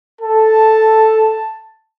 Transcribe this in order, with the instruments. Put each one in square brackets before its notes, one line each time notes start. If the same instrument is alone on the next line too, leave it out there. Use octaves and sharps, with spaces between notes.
[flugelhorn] A4 [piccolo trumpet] A5